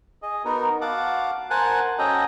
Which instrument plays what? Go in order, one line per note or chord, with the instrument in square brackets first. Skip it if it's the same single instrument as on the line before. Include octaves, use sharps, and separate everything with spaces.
[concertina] G#4 D#5
B3 D#4 F#4 A#4
F#4 F5 F#5 A5 D6
A#4 C5 F#5 G#5 A5 F#6
C#4 F#4 A4 D#5 G5 A#5